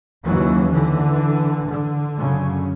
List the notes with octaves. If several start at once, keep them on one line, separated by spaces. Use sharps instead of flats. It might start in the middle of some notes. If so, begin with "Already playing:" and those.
D#2 C#3 E3 F#3
D3 E3
D3
F#2 C#3